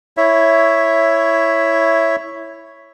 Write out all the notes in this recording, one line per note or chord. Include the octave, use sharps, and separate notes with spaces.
E4 C#5 E5